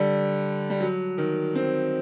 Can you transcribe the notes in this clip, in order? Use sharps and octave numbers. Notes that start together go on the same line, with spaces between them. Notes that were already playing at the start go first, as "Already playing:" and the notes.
Already playing: D3 G3
G3
F#3
D#3
C4